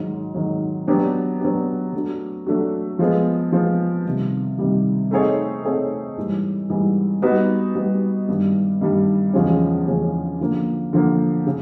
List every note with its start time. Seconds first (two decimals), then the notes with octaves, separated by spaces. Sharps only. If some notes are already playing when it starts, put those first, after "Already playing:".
Already playing: G#2 D#3 F#3
0.35 G#2 D#3 F#3
0.87 F#3 B3 D4 G4
1.41 F#3 B3 D4 G4
1.93 F#3 A3 D4 F#4
2.46 F#3 A3 D4 F#4
2.99 F3 G#3 B3
3.52 F3 G#3 B3
4.05 C3 D#3 G3
4.58 C3 D#3 G3
5.11 A3 C4 D#4 G#4 C#5
5.64 A3 C4 D#4 G#4 C#5
6.17 G#2 E3 G3
6.70 G#2 E3 G3
7.22 G3 B3 D#4 F#4 B4
7.75 G3 B3 D#4 F#4 B4
8.28 G2 D#3 G3
8.81 G2 D#3 G3
9.33 E2 C#3 F3 G#3 C#4
9.87 E2 C#3 F3 G#3 C#4
10.40 D3 F3 A#3
10.93 D3 F3 A#3
11.47 C#3